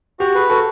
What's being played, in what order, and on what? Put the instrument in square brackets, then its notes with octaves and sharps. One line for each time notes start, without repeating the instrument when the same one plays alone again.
[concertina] F#4 [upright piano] G4
[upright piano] G#4 [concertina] B4
[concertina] F#4 [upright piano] A4